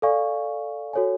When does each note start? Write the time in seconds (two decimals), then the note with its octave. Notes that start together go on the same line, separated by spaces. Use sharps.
0.02 A4 D5 F5 G#5 C#6
0.93 F#4 A4 C#5 G#5